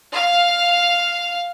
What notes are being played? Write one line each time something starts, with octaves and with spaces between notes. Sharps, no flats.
F5